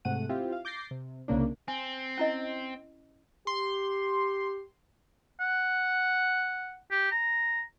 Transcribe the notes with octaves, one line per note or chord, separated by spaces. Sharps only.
G#2 C3 A3 F#5 D#7
C4 E4 F4 G4
F5
D6 G6 A6 A#6 C7
C3
C2 C#3 A#3 D4
C4 G#5
C#4 E4 D#5
G4 C6
F#5
G4
A#5